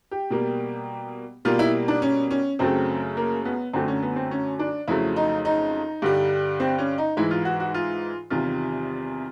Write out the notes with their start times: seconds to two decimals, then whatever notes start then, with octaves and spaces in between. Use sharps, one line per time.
0.11 G4
0.30 B2 G3 A#3
1.45 B2 G3 A#3 F4
1.59 E4
1.88 D4
2.02 C#4
2.31 C#4
2.59 F#2 C#3 F#3 A3 C4
3.17 A#3
3.45 B3
3.73 F#2 D3 F#3 A3 C4
3.88 C#4
4.02 B3
4.16 C4
4.31 C#4
4.59 D4
4.88 F2 C#3 F#3 A3 E4
5.16 D#4
5.45 D#4
6.02 G2 D3 G3
6.60 C4
6.78 C#4
6.98 D#4
7.17 G#2 E3 G#3 E4
7.31 F4
7.45 F#4
7.60 F#4
7.74 F4
8.30 E2 C3 D#3 G3 F4